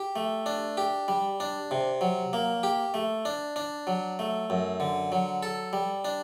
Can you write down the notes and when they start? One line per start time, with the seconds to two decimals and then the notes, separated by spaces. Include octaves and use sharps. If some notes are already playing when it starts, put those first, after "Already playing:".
Already playing: G4
0.16 A3
0.46 D4
0.77 G4
1.08 G3
1.40 D4
1.71 C3
2.01 F#3
2.33 A#3
2.63 G4
2.94 A3
3.25 D4
3.56 D4
3.87 F#3
4.19 A3
4.50 F#2
4.80 D3
5.12 F#3
5.43 A4
5.73 G3
6.05 D4